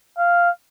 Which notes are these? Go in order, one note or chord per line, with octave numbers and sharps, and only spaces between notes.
F5